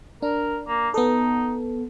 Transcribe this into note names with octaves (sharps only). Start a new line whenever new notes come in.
D4 A#4
A#3
B3 D#4 A4